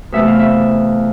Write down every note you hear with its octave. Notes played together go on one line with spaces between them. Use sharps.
E2 C3 E3 A3 E5
F5
E5